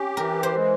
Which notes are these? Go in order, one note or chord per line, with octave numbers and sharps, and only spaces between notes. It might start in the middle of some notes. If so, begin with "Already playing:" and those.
Already playing: C#4 G4
E3 A#4
C5
G#3